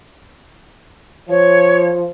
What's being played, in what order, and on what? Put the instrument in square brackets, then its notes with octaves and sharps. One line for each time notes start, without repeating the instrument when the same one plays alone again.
[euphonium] F3 [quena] C#5